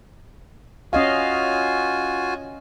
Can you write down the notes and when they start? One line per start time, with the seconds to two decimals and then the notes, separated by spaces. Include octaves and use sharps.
0.93 C#4 F4 F#4 D#5 F5 G#5